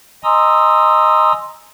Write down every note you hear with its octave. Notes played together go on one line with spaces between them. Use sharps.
D#5 G#5 A#5 C6 D#6 E6